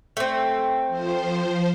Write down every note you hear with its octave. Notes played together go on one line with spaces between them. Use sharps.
A3 C4
F3 C5